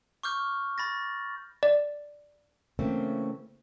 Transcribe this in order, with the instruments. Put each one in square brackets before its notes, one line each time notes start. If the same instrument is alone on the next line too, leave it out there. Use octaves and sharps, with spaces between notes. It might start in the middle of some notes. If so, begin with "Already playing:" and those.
[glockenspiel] C#6 D6 F6 G6
B5 A6 A#6
[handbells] D5
[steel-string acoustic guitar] C#3 E3 A3 A#3 C4 C#4